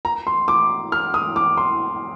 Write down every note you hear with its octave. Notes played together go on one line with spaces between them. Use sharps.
A#5
C6
D6
F6
D#6
D6
C6